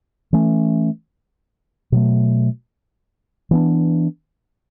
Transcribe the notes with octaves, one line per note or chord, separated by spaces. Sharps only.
E3 A3 C#4
B2 F#3 A3
E3 B3 D4